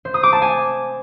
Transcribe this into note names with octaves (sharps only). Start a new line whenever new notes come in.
C5
D#6
D6
A5
G#5